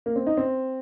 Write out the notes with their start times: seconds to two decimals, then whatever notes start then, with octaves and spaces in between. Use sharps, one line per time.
0.06 A#3
0.16 C4
0.27 D#4
0.37 C4